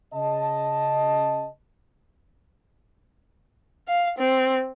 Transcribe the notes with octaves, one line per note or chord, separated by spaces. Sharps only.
C#3 D#5 A5
F5
C4